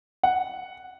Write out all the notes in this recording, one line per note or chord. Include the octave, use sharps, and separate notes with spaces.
F#5